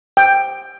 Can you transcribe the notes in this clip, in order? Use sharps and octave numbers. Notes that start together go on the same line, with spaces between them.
G5